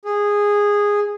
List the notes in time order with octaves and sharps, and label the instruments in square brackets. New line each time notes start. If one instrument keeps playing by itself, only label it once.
[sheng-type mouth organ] G#4